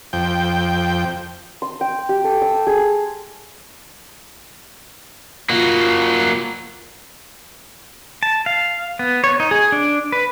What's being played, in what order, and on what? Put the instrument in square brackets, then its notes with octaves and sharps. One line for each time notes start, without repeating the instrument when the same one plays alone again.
[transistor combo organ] F2 G5
[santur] C6
G5
G4
A4
E6
G#4
[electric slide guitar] A#3 F#4 [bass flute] F4
[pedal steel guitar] A5
F5
B3
C#5
D#4
G#4
D4
B4